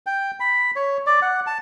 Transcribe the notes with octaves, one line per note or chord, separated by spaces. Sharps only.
G5
B5
C#5
D5
F#5
A5